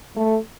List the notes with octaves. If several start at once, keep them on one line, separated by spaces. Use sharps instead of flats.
A3